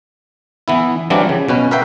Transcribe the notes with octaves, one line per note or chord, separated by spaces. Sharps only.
E3 B3 E4
E3 F#3 G3 C4 D4 F4
C#3
B2 C#4 B4
F#4 A#4 B4 E5 F5 G5